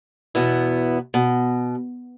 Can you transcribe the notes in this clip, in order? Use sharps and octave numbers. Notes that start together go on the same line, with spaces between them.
E2 B2 B3 E4
B2